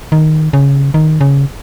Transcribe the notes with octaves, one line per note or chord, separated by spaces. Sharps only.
D#3
C#3
D#3
C#3